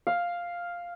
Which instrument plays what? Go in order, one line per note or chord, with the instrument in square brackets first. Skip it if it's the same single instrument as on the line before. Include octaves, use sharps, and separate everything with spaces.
[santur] F5